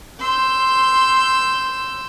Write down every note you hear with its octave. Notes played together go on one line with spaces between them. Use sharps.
C6 E6 G6